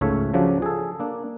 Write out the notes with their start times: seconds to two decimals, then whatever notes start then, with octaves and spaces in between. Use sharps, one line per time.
0.01 C#2 G#2 A3 C#5 E5 F5
0.34 C#3 F3 F#3 D4
0.62 G#4 A4
1.00 A#3 D4